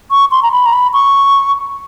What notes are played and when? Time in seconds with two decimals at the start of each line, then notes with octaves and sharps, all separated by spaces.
0.11 C#6
0.31 C6
0.43 A#5
0.52 B5
0.66 A#5
0.73 B5
0.93 C#6